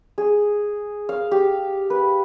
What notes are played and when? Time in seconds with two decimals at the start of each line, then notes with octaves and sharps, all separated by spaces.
0.18 G#4
1.09 F5
1.31 G4
1.90 B4